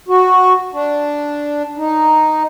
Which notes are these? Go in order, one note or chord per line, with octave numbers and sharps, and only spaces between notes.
F#4
D4
D#4